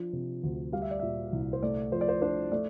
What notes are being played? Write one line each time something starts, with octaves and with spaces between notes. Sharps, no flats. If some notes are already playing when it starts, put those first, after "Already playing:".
Already playing: F3 D4
C3
D2
G3 F5
E5
D5
A#2 E5
C2
C5
A3 D5
F3 C5
D5
C5
D4 C5
A3 D5